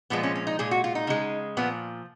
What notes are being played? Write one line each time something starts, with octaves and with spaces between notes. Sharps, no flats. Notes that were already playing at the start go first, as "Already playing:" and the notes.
A#2 F3 G#3 B3
C#4
C#4
D#4
A#2 G#3 G#4
F#4
F4
D#4
C#3 G#3
A#2 F3 B3